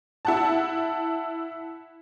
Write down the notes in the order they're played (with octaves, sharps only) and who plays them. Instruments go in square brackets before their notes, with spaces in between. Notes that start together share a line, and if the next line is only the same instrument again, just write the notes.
[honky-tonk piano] E4 F#5 A5